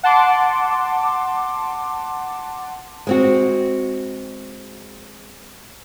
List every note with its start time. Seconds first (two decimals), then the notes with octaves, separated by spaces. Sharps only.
0.03 F#5 A5 C6 D6
3.07 G#3 C4 F#4